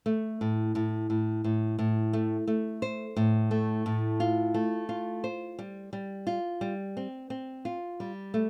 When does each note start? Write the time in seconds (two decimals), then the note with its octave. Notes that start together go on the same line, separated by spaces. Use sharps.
0.06 A3
0.41 A2
0.75 A2
1.10 A2
1.44 A2
1.79 A2
2.13 A3
2.47 A3
2.82 C5
3.16 A2
3.51 A3
3.86 A2
4.20 F4
4.54 A3
4.89 F4
5.24 C5
5.59 G3
5.93 G3
6.27 F4
6.61 G3
6.97 C4
7.30 C4
7.65 F4
8.00 G3
8.34 A3